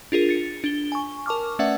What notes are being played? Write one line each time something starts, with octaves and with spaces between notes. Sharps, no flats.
D4 F4 G#4 A#4
A6 C#7
D4 G7
G#5 C#6
A#4 A5 C#6 D6 F6
A3 C#4 B4 D5 E5 F#5